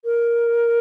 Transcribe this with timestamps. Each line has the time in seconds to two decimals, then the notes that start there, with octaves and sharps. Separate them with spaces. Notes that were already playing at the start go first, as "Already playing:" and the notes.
0.05 A#4